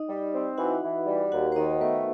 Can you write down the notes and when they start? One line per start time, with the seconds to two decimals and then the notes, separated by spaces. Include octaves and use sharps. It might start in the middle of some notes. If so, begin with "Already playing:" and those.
Already playing: D#4 D#5
0.08 G3
0.34 C4
0.57 E3 F#4 F#5
0.82 E3
1.06 G3
1.32 D#2 F#4 F#5
1.52 C5
1.56 D#3 D#4 D#5
1.80 A3 B3 B4